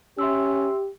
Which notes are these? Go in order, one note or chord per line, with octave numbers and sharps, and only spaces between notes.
C#4 G4 E5 C6 E6